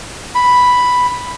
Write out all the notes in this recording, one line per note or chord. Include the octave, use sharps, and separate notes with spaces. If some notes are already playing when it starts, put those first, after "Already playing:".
B5